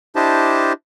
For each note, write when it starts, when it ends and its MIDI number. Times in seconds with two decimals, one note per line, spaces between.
0.16 0.73 62
0.16 0.73 64
0.16 0.73 67
0.16 0.73 72
0.16 0.73 75
0.16 0.73 81